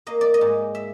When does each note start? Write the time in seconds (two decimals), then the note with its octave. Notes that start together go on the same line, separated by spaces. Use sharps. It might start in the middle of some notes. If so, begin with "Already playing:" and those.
0.07 A#3 D#5
0.21 D5
0.34 D#5
0.41 G#2
0.75 E5